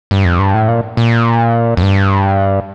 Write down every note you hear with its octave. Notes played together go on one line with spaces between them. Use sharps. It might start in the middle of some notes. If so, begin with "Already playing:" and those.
G2
F2
G2
A2
A#2
A#2
F2
G2